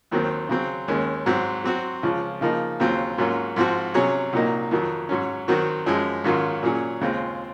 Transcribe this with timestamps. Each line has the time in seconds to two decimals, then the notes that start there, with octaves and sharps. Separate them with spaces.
0.11 D#2 D#3 F#3 C4
0.49 C#3 F#3 C4
0.88 D#2 D#3 G#3 C#4
1.26 G#2 F#3 C4
1.64 F#3 C4 F#4
2.03 C#2 C#3 F3
2.41 C#3 F3 A#3 D#4
2.80 D#2 C#3 F#3 C4 F4
3.18 G#2 F#3 A#3 C#4 F4
3.56 G#2 F3 C4 F#4
3.94 C3 F#3 C#4 G#4 C#5
4.33 C2 A#2 F#3 A#3 D#4
4.71 F2 D#3 F#3
5.09 G#2 F#3 C#4
5.48 D#3 F#3 C4 F#4
5.86 F#2 F3 G#3
6.24 G#2 D#3 F#3 C#4 F4
6.63 A#2 F#3 C#4 G#4
7.01 D#2 C#3 G#3 C4 F4